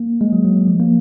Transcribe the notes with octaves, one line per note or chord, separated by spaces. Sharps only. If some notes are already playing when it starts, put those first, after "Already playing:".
Already playing: A#3
G#3
F#3
F#3
F3
A#3